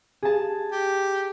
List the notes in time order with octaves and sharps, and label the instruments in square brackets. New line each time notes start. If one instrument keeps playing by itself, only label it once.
[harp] G#4 A5
[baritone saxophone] G4